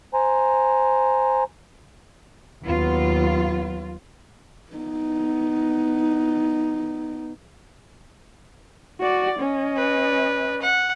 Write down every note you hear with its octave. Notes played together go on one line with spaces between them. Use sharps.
C5 G#5 A#5
D#2 F#3 B3 F4
B3 D#4
F#4 D5
C#4 D#5
B4
F#5